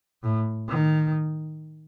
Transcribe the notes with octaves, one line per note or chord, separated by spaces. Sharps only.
A2
D#3